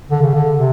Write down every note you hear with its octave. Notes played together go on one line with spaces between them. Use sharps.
D3
C#3
D3
C3